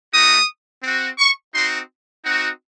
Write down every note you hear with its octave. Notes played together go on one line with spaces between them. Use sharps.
A3 D#4 F#4 D#6
C4 F#4
C#6
C4 D#4 F#4 C6
C4 D#4 F#4